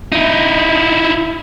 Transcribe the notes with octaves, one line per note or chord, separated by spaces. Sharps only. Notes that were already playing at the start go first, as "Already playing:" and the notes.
D#4 E4